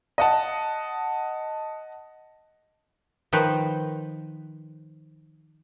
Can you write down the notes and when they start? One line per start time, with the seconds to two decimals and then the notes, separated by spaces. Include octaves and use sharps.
0.18 D#5 F#5 A5
3.33 D#3 F3 B4 C5